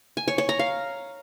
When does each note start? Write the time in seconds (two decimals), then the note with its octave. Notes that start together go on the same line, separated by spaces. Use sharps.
0.17 G#5
0.28 C#5
0.38 C#5
0.49 A#5
0.59 F5